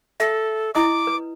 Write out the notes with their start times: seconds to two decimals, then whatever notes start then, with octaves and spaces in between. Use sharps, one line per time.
0.20 A4 E5
0.75 E4 D#5 D6 D#6
1.07 B4